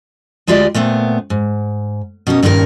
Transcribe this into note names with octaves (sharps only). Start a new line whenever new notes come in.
D2 G#3 F4 G4 D5 D#5
A#2 A3 B3 C4
G#2
B2 C#4 D#4 A#4
G2 A#2 D#3 C#4 G4 A#4